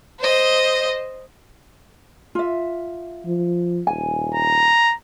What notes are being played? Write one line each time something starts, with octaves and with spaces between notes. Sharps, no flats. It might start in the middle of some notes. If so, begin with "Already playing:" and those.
C5 D#5
F4 E5
F3
D#1 G#5
A#5